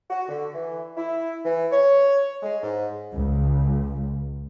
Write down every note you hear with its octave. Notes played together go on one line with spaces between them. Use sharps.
F#4
D3
E3
E4
E3
C#5
G#3
G#2
C#2